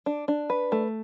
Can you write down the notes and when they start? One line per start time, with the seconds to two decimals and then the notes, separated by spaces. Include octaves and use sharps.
0.06 D4
0.28 D4
0.50 B4
0.72 A3